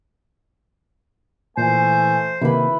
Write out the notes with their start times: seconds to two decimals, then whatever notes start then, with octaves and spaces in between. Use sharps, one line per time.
1.57 A#2 E3 A3 C5 G#5
2.41 C3 D#3 A#3 E4 B4